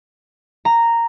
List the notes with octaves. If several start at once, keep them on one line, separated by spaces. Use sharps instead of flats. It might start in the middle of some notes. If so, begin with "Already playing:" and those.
A#5